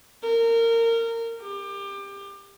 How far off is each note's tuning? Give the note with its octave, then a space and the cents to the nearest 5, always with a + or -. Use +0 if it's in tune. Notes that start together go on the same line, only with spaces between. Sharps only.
A#4 -25
G4 +25